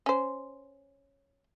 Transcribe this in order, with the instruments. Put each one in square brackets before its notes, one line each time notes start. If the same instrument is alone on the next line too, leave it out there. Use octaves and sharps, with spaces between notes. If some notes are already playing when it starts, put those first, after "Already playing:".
[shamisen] C#4 C5